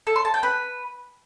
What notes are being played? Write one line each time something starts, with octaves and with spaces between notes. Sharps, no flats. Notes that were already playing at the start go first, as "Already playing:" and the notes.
A4
C6
A5
G5
B4